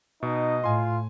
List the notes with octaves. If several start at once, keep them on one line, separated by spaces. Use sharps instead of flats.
B2 D#4 D#5
A2 F4 G#5 C6